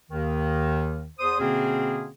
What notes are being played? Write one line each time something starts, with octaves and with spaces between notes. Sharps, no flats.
D#2 D#3
E2 C5 D#6
B2 D3 A#3 C4 C#4 G#4